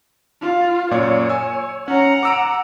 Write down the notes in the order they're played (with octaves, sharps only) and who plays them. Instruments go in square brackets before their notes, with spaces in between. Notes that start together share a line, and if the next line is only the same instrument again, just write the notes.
[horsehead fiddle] F4
[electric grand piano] F#2 A#2 D5 [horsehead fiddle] C#5
[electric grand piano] G#5 E6
[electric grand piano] C#4 [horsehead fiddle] F#5 A#5
[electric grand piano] D6 E6 D7